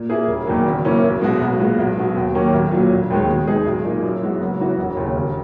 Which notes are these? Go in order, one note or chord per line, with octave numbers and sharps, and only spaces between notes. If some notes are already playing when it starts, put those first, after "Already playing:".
Already playing: A#2
A#3 E4 G#4
E1
E2 D#3 F#3 A#3
F#1
F#2 E3 A#3 C#4
B1
B2 G#3 B3 F#4
B1
A#2 G#3 B3 F#4
B1
B2 F#3 B3 F#4
D#2
D#3 F#3 A#3 C#4
B1
A#2 F#3 C#4
E1
D#2 D#3 G#3
B2
G#3 D#4 G#4
B1
A#2 A#3 D#4
F#2
E3 G#3 B3 F#4
F#1
F#2 E3 B3 F#4
E1
D#2 C#3
E1